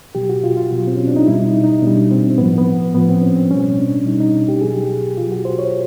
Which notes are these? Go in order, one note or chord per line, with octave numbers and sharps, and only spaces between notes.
B2 F#3 G4
F#4
F4
F4
B2 F#3
C4
C#4
D4
D#4
B2 G3 E4
D#4
D#4
B2 G3 D4
C4
A2 F3 B3
B3
A2 F3 B3
C4
C#4
C4
B2 G3 C#4
D4
B2 G3 D#4
D#4
G4
B2 F#3 G#4
G4
B2 F#3 F4
F#4
C5
C#5